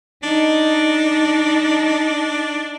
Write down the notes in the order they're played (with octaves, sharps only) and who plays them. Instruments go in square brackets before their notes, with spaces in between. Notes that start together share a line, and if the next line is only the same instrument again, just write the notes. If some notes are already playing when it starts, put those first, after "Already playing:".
[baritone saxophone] D4 [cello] D#4